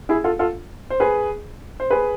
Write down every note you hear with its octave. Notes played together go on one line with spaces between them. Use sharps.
E4 G#4
F4 A4
F4 A4
C5
G#4 B4
C5
G#4 B4